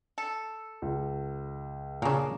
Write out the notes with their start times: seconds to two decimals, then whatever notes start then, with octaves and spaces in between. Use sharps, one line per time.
0.18 A4
0.82 C#2
2.02 A#2 C#3 A#3 D4